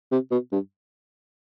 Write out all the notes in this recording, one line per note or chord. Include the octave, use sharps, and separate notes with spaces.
C3
B2
G2